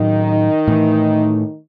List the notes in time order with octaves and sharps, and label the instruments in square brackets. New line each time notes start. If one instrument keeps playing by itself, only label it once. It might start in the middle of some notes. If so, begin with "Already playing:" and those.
Already playing: [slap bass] A2 F#3 C#4 [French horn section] D#3 D#4
[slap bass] A2 E3 A3